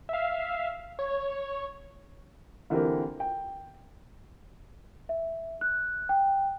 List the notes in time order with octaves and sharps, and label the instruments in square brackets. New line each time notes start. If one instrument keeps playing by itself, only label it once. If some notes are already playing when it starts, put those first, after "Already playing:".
[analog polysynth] E5 F5
C#5
[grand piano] D3 E3 A#3 C4 G4 A#4
G5
[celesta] E5
F#6
G5